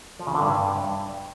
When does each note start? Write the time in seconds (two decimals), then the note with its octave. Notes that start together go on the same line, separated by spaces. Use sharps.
0.19 F3
0.27 C#3
0.35 D3
0.42 G2